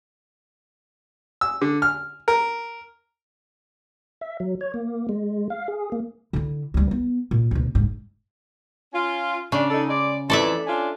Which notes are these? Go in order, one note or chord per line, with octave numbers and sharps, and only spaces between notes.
E6
D3
F6
A#4
E5
F#3
C#5
A#3
G#3
F5
G#4
A#3
D3 E4
D2 G3
B3
A#2
D2 B2
F#1 G#2
C#4 F4
C#3 D4
D4 D#4 A4
G#3 D5
F2 E3 A4 D5 E5
C#4 D4 F4